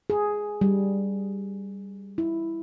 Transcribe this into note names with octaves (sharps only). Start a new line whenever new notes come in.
G#4
G3
E4